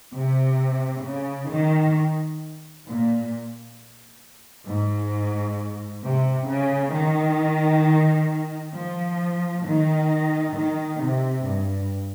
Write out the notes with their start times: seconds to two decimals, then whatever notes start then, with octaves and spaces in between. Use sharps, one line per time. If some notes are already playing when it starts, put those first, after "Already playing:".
0.15 C3
1.05 C#3
1.52 D#3
2.87 A#2
4.67 G#2
6.03 C3
6.48 C#3
6.93 D#3
8.74 F3
9.64 D#3
10.55 D#3
11.00 C3
11.45 G2